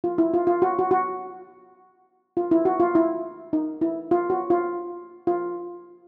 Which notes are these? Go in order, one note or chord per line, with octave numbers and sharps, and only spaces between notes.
F4
E4
F4
F4
F#4
F#4
F#4
F4
E4
F#4
F4
E4
D#4
E4
F4
F#4
F4
F4